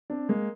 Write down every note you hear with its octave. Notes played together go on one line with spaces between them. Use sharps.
C4 D4
G#3 A#3